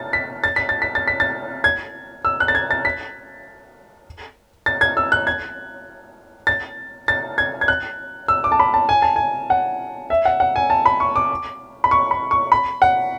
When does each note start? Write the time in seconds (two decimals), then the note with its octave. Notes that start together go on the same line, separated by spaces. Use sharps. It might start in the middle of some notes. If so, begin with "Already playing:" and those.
Already playing: A6
0.13 B6
0.44 A6
0.56 B6
0.69 A6
0.82 B6
0.95 A6
1.08 B6
1.20 A6
1.64 G#6
2.25 E6
2.40 F#6
2.48 A6
2.55 G#6
2.71 A6
2.85 B6
4.66 A6
4.81 G#6
4.97 E6
5.12 F#6
5.27 G#6
6.47 A6
7.08 A6
7.38 G#6
7.61 G#6
7.68 F#6
8.28 E6
8.44 D6
8.52 A5
8.60 B5
8.74 A5
8.89 G#5
9.02 A5
9.16 G#5
9.50 F#5
10.10 E5
10.25 F#5
10.40 F#5
10.56 G#5
10.70 A5
10.86 B5
11.00 C#6
11.16 D6
11.84 B5
11.91 C#6
12.11 B5
12.31 C#6
12.52 B5
12.82 F#5